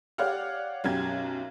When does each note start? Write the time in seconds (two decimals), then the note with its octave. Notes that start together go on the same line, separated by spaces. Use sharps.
0.18 G4 C#5 D5 F5 F#5 F6
0.84 B1 F#2 C#4 G4 G#6